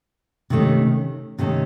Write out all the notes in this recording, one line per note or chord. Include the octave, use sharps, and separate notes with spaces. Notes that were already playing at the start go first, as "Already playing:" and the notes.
C3 D#3 A3 C#4
C3 D#3 A3 C#4